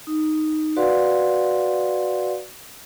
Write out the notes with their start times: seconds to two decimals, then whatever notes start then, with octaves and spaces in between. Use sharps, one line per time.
0.07 D#4
0.76 F#4 B4 D5 F5 F#5 C6